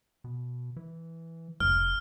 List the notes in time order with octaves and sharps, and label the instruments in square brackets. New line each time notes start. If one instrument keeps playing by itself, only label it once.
[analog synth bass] B2
E3
[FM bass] F1 [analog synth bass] C#2 [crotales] F6